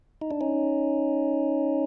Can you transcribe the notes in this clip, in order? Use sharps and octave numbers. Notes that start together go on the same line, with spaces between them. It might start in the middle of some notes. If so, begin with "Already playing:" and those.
D#4
D4
C#4 D#4